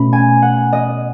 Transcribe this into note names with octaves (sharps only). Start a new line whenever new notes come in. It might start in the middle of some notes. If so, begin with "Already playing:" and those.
Already playing: B2 A3 C#4 B5
G#5
F#5
D#5